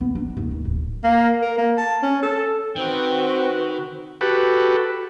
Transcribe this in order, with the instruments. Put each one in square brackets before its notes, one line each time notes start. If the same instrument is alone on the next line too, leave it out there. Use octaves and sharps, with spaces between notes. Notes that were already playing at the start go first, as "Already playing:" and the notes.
[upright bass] B3
D4
D#2
D#2
D1
[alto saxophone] A#3
A#4
A#3
A5
C#4
A4
[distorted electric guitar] D#3 [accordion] C4 [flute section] F#4 B4 [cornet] G5
[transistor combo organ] F#4 G4 A4 B4